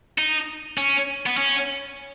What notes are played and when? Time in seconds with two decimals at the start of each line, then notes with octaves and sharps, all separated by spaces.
0.18 D#4
0.78 C#4
1.26 B3
1.37 C#4